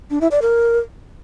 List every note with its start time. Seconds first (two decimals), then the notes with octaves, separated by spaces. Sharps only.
0.11 D4
0.21 E4
0.31 D5
0.42 A#4